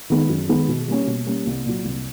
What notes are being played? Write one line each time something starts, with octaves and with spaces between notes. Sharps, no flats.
D#3 G#3 B3
F#2
D#3 G#3 B3
B2
G3 A#3 C#4
B2
G3 A#3 C#4
C2
A#2 F#3
C2